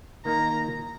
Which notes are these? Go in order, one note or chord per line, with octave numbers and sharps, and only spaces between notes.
D#3 A#3 D#4 A#5